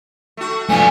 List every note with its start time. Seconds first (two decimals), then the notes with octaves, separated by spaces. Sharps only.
0.37 A3 F#4
0.69 F3 A3 B3 D4 F4 G#5